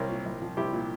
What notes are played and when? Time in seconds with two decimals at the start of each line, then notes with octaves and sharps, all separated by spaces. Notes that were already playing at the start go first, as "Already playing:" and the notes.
Already playing: C2 A#4 C#5
0.10 A#2
0.26 C2
0.42 F3
0.57 C2 E4 G4
0.73 A#2